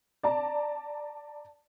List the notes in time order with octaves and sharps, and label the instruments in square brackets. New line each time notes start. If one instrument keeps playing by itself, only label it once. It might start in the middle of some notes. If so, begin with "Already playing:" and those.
[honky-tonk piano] D5 A5 A#5